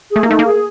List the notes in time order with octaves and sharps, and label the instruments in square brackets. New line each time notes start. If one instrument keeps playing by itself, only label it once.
[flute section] G#4
[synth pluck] A3
A#3
[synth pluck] A3 [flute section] D#4
[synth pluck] A#3
[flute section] G#4